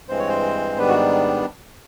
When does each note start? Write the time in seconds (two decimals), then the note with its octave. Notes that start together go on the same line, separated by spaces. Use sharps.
0.08 G2 E3 G#3 C4 C5
0.19 C#5
0.29 C5
0.77 G#2 D#3 G3 B3 D4 B4
0.88 F#4